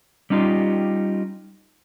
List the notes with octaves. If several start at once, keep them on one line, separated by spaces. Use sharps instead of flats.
G3 C#4 D#4 F4 G4